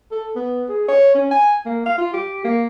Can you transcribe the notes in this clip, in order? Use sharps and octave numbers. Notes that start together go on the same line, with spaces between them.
A4
B3
G#4
C#5
C#4
G#5
A#3
F5
F4
G4
A#3